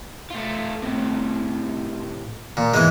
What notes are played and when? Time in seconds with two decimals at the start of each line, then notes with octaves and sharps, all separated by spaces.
0.30 A3 F4
0.82 A2 C3
2.57 A#2
2.74 E2 G#2 E3 G#3